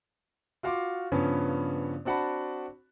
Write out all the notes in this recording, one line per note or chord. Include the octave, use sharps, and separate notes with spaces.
F4 F#4 F5 C6 D6
G2 C#3 F3 B3 C#4
C4 D4 F#4 F#5 A5 B5